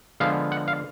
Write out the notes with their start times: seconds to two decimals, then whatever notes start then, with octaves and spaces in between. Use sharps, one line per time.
0.20 D3 F3 G#3 B3 F5
0.52 F#5
0.68 F5